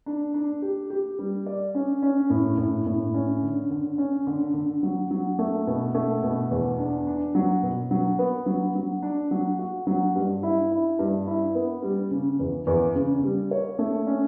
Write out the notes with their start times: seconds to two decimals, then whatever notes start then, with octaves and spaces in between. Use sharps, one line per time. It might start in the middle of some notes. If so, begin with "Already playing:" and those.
0.06 D4
0.34 D4
0.62 G4
0.90 G4
1.19 G3
1.46 D5
1.75 C#4
2.02 C#4
2.30 A2
2.58 A2
2.86 A2
3.14 C#4
3.43 D3
3.70 D3
3.98 C#4
4.27 D3
4.54 D3
4.83 F#3
5.11 F#3
5.39 A3
5.67 B2
5.95 A3
6.23 B2
6.51 E2
6.78 D4
7.07 D4
7.35 F#3
7.63 B2
7.91 F#3
8.19 B3
8.46 F#3
8.75 F#3
9.03 D4
9.31 F#3
9.59 F#4
9.87 F#3
10.16 G2
10.43 E4
10.72 E4
10.99 G2
11.27 E4
11.55 B3
11.82 G3
12.11 C#3
12.39 E2
12.67 E2
12.95 C#3
13.23 G3
13.51 C#5
13.79 A3
14.07 C#4